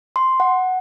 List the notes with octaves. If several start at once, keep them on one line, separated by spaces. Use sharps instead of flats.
C6
F#5